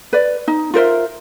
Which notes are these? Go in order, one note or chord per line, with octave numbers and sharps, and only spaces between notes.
B4 D5
D#4
F4 A#4 C5 E5